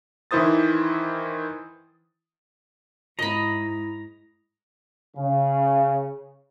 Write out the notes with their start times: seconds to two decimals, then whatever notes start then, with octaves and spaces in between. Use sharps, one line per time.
0.31 D#3 E3 E4 C5 D#6 A6
3.19 G#2 E4 D#5 A#5 B5
5.17 C#3